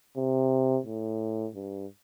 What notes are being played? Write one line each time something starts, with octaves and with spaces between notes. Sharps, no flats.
C3
A2
G2